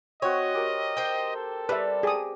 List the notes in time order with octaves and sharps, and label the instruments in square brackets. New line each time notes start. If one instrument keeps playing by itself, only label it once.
[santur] C4 F#4 [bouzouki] C#5 [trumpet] D#5
[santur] G4 A#4 A#5
[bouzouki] C5 G5
[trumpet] A4
[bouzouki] G3 [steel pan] B4 E5
[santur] G4 [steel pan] G#4 D#6